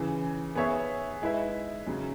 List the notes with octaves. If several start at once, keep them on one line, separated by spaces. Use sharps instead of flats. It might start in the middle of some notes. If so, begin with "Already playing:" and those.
Already playing: C#3 E3 C#4
B3 G#4 C#5 E5
G#3 E4 B4 E5
C#3 F#3 C#4